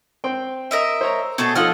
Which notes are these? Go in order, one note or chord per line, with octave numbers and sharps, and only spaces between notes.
C4 G5 C6
A#4 D#5 E5
C5 C#5 A#5
B2 A3 G#4 A4 C#6
F3 D#4 F4 A4 F#5 F6